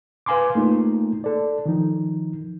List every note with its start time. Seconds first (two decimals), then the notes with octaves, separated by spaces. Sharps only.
0.26 B4 F5 G#5 C6 D6
0.55 A3 A#3 D#4 F4
1.24 A4 D5
1.66 D#3 F3 D#4